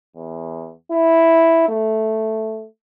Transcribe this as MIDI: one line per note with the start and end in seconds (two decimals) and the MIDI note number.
0.16 0.72 40
0.92 1.68 64
1.69 2.66 57